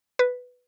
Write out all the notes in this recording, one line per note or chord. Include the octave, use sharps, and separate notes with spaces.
B4